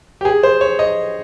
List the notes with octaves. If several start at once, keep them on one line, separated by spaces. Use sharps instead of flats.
G4
G#4
C5
C#5
D#5